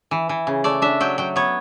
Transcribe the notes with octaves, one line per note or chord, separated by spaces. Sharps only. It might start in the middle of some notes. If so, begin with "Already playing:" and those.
E3
E3
C#3
A3 D5
D4 E5
F#3 G5
F#3 G5
B3 C#5